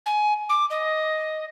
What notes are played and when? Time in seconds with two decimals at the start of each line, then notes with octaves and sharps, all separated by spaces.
0.06 G#5
0.49 D6
0.70 D#5